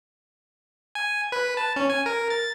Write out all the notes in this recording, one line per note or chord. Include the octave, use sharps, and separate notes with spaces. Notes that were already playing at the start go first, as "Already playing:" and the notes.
G#5
B4
A5
C#4
G#5
A#4
A6